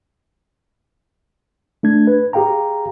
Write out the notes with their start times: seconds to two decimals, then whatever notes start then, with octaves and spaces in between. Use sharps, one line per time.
1.83 A3 D4 G#6
2.07 B4
2.33 G4 G#4 F5 G5 A#5